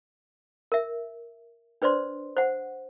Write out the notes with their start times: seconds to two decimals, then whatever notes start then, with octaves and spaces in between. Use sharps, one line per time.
0.72 A#4 E5
1.82 D4 B4 C5 D5 C6
2.37 C5 F#5